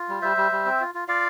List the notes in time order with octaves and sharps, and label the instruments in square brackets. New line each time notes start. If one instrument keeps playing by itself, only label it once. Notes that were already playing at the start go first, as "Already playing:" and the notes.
Already playing: [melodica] F4
G3
G3 C5 E5
G3
G3
C4
F4
F4
F4 D5 F5